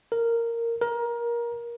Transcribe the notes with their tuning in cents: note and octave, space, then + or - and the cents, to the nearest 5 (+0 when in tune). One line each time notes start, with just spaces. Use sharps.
A#4 -10
A#4 +20